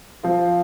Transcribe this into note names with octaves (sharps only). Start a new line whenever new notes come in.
F3 C4 F4